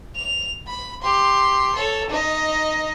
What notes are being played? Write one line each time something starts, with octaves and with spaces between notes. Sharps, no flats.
F7
B5
G4 C6
A4 C#5
D#4 D#5